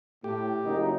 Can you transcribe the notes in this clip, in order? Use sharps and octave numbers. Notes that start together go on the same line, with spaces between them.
A2 G4
F#1 F#2 D#4